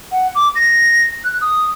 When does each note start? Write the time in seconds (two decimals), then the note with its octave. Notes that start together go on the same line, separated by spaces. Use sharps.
0.12 F#5
0.35 D6
0.56 A#6
1.24 F#6
1.41 D#6